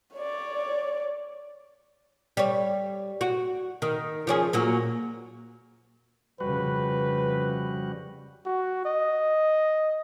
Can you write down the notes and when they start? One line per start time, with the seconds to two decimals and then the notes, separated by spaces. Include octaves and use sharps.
0.15 C#5 D5
2.37 G3 C#5
3.21 F#4
3.82 D#3
4.27 F3 C#4 G#4
4.53 A#2 F#3 A#3
6.40 F2 C#3 G3 F#4 B4
8.45 F#4
8.85 D#5